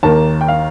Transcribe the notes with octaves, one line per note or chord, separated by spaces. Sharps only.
D#2 D#3 A#3 A5
G5
F5